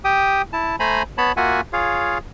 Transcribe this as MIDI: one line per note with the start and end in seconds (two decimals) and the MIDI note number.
0.04 0.42 67
0.04 0.42 79
0.04 0.42 87
0.53 0.76 64
0.53 0.76 81
0.80 1.03 57
0.80 1.03 72
0.80 1.03 80
0.80 1.03 82
0.80 1.03 83
1.18 1.32 59
1.18 1.32 73
1.18 1.32 81
1.18 1.32 83
1.37 1.61 58
1.37 1.61 65
1.37 1.61 66
1.37 1.61 76
1.37 1.61 78
1.37 1.61 80
1.73 2.18 65
1.73 2.18 68
1.73 2.18 73
1.73 2.18 77